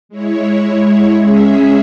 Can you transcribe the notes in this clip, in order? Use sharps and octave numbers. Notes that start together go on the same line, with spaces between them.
G#3 E4 C#5
G#3 C#4 G#4 E5